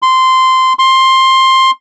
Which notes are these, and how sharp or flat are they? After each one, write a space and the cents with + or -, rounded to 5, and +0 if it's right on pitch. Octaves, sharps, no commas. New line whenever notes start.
C6 -10
C6 +15